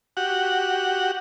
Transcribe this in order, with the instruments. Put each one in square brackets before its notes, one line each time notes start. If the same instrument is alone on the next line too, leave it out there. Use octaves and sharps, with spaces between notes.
[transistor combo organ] F#4 G4 F#5